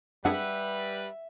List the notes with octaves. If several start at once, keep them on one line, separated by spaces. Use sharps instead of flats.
G3 C4 D4 G#4 B4 E5 F#5